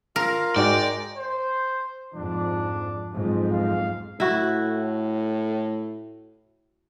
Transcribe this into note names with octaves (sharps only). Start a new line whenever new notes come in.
F4 A#4 F5
G#2 G#3 F#4 D5 G5 A#5
C5
F2 G#2 D4
B1 F2 G#2
F5
A2 E4 F#4